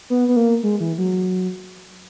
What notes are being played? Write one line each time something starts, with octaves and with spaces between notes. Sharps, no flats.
B3
B3
A#3
G#3
E3
F#3